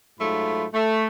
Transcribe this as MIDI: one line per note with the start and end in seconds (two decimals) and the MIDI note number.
0.18 0.64 44
0.18 0.64 54
0.18 0.64 57
0.18 0.64 65
0.18 0.64 83
0.72 1.05 57